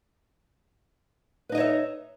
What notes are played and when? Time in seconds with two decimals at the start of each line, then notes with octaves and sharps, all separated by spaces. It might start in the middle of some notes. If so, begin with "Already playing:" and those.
1.49 B4
1.52 D#4
1.55 D#5
1.57 C#5
1.60 E5